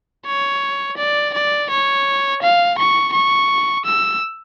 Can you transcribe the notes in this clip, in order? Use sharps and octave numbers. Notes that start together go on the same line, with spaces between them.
C#5
D5
D5
C#5
F5
C#6
C#6
E6